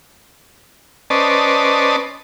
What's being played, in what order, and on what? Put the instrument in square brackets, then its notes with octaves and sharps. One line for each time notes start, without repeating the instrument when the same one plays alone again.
[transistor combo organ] C#4 B4 C5 D5 D#5 A5